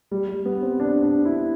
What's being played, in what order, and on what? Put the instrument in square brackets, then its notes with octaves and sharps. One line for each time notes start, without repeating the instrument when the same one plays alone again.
[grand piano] G3
G3
B3
C4
D4
D4
E4